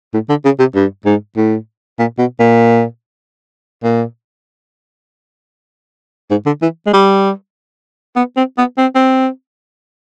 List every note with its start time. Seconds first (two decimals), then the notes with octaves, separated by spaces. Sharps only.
0.14 A2
0.29 D3
0.45 C#3
0.59 C3
0.75 G2
1.05 G#2
1.37 A2
1.99 A#2
2.19 B2
2.40 A#2
3.84 A#2
6.31 G#2
6.46 D3
6.62 E3
6.86 G#3
6.93 G3
8.16 B3
8.37 C4
8.58 B3
8.78 C4
8.95 C4